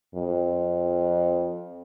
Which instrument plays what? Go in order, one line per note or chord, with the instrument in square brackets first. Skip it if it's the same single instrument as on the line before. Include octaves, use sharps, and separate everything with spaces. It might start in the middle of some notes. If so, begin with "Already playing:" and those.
[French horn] F2